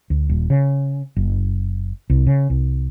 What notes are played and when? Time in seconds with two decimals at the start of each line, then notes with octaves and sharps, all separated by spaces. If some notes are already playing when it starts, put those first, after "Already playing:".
0.10 D2
0.29 D#1
0.50 C#3
1.16 F#1
2.10 C2
2.27 C#3
2.50 C2